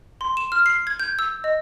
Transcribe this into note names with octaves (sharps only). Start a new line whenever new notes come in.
C6
E7
F6
C7
G#6
G6
E6
D#5